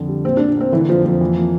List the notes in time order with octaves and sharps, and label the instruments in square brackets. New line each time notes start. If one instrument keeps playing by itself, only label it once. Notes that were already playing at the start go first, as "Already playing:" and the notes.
Already playing: [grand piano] F2 D3
G3
[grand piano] A#2 [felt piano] C4
[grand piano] A#2 [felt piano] D4
[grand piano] A#3 [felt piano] C4
[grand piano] D3 [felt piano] E3
[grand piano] F2 [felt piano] F3
[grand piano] F2 [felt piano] F3
[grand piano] E3
A#3